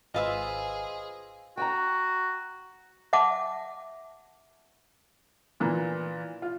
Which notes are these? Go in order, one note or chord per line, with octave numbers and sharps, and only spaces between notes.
G#1 F4 G#4 B4 C5 D#5 F5 E6
F#4 G5 G#5 A#5
E5 F#5 A5 D6
A#2 E3 A#3 A#5
F4